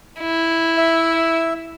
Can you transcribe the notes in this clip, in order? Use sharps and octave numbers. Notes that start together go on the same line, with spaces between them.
E4
E5